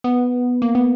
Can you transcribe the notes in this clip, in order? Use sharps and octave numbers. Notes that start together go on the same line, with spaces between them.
B3
A#3
B3